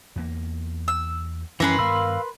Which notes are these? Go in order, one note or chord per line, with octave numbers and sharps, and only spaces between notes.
E2 A#3
E6
F#2 E3 F3 G3 C#4 A#4 B4 C6
G2 D#3 B3 F5 B5 E6